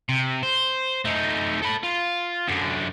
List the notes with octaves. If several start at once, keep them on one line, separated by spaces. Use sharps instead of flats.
C3
C5
A3 D#4
A4 B5
F4
F#2 D3